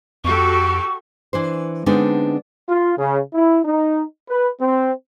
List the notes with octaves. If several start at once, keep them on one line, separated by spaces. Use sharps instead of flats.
F2 F#4 G4 A4 C#6
E3 D4 C5
D3 G#3 B3 C4 D4 D#4
F4
C#3
E4
D#4
B4
C4